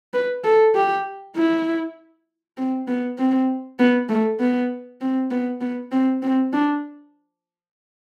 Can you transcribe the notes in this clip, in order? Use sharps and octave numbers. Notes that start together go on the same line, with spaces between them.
B4
A4
G4
E4
C4
B3
C4
B3
A3
B3
C4
B3
B3
C4
C4
D4